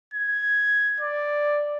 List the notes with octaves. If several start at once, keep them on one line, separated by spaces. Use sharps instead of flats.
G#6
D5